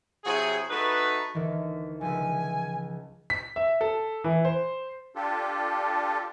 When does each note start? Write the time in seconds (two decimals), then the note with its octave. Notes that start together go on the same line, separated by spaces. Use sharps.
0.24 C3 F#3 E4 F#4 G#4
0.70 A3 D#4 F#4 B4
1.34 D2 D#3 E3
2.01 C#2 F3 A3 G#5
3.30 B6
3.56 E5
3.81 A4
4.24 E3
4.45 C5
5.16 D4 F4 G4 A4